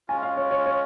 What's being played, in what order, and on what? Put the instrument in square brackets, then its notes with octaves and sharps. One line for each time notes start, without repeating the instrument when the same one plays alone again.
[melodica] G#3 C#4 F4 [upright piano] G#5
[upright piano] F5
C#5
C#5
C#5